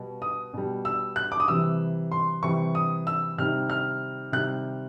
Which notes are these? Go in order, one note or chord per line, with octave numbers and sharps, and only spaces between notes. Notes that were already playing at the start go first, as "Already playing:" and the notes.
Already playing: B2 G3
D#6
B2 G3
E6
F#6
D6
D#6
C3 E3 G3 E6
C6
C3 E3 G3 C#6
D#6
E6
C3 D#3 G3 F6
F6
C3 D#3 G3 F#6